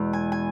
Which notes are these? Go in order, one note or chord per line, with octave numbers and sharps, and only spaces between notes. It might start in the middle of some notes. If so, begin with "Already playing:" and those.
Already playing: E2 B2 G#3 B3
G#5
G#5